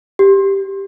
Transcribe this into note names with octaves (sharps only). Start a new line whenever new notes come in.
G4